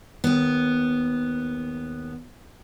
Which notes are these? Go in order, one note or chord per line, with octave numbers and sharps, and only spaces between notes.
D#2 B3